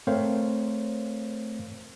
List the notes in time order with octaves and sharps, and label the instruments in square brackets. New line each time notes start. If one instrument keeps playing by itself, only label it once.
[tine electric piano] A3 C4 A#4 C5 C#5 F5